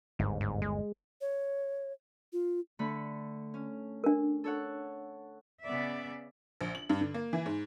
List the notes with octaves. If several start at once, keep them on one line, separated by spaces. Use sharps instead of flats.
G1 D#2 G#2
G#2
G#3
C#5
F4
D3 A3 B5
C#4
D4 A#4
A4 C#5 F#5
C#3 B3 D5 E5
A#1
F#7
G2
D3
A#3
E3
G#2